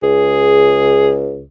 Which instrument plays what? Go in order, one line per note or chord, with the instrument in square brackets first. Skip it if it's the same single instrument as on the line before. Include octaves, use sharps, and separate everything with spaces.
[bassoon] C#2 [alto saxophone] G#4